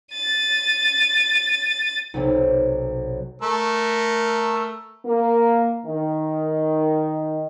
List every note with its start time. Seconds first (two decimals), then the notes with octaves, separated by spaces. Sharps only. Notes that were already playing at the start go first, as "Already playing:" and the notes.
0.14 A6 D#7
2.14 B1 C3
3.42 A3 A#4 E6
5.05 A#3
5.86 D#3